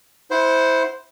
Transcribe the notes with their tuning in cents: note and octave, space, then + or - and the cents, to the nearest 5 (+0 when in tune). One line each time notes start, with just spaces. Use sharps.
E4 -15 C5 +0 F#5 +0